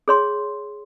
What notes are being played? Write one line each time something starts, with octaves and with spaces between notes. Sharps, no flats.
G#4 C#5 C6